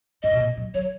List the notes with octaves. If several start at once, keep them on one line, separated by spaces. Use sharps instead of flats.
G#2 D#5
B2
A#2
F#3
F#3 C#5